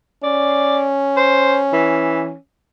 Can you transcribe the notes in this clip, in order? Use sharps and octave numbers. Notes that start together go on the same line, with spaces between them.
C#4 D5
C5
E3